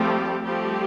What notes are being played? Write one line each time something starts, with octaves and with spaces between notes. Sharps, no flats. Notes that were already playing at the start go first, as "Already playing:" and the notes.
Already playing: F3 G3 A3 C4 G4
F3 G3 A3 C4 G4